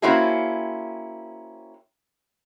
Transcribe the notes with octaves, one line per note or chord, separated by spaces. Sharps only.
A#3 C4 C#4 E4 F#4 G#4